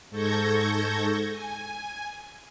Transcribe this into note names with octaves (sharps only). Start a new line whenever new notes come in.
G#2 A4 C#6 G6 G#6 A#6
G#5